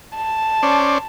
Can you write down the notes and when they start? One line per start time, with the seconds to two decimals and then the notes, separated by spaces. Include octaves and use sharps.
0.15 A5
0.63 C#4 C5 D5